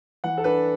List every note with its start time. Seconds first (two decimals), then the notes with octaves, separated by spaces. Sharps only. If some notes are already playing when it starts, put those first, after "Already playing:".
0.24 E3 F#5
0.38 A4
0.44 D4 B4